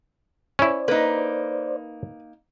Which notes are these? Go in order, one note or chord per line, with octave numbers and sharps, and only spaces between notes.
C#4 E4 C5 D5
A#3 D#4 B4